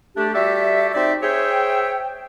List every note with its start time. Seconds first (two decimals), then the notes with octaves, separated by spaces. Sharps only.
0.16 A3 D4 G4
0.34 G3 F#4 G4 A4 E5
0.94 C4 D#4 D5 E5
1.22 G#4 C5 C#5 E5 G5